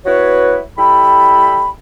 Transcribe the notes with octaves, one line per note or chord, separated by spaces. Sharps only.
B3 E4 F#4 B4 C#5
G3 E4 A4 G5 B5